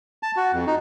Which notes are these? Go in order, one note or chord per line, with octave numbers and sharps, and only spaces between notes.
A5
F#4
F2
D#4